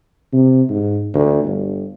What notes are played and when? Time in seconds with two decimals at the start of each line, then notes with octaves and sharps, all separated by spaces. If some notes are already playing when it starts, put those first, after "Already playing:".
0.33 C3
0.70 G#2
1.14 D2
1.44 G1